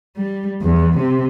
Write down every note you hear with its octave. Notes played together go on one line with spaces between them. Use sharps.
G3
E2
C3